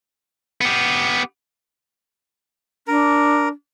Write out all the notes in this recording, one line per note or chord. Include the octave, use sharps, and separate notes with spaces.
B3 G4
D4 A#4